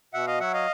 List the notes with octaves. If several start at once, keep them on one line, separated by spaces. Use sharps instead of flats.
B2 E5 F#5
D#5 F5
F#3 E5 F#5
D#5 F5